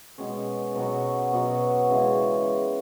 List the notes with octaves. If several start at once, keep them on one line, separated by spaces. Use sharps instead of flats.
B2 G#3 C#4
B2 F#3 B3 F#4
B2 F#3 B3 F#4
C#3 E3 G#3